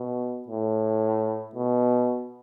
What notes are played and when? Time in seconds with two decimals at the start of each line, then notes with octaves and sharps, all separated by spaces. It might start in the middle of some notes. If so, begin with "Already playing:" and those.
Already playing: B2
0.48 A2
1.55 B2